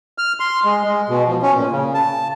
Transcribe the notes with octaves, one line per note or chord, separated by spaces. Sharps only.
F6
C6
G#3
G#3
B2
F3
C#4
A#2
C#3
A5